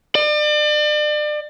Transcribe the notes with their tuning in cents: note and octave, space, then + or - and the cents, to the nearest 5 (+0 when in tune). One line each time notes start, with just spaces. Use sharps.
D5 +35